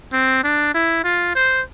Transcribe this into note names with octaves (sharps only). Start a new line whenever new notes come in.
C4
D4
E4
F4
C5